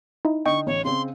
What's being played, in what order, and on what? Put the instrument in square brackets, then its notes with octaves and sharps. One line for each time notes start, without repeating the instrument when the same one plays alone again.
[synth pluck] D#4 E4
[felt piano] D3 [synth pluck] D#5 G5 [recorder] C#6
[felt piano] A1 [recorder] C#5
[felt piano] C#3 C4 [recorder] C6